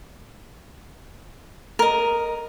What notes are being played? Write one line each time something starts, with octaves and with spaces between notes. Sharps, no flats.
A#4 D#5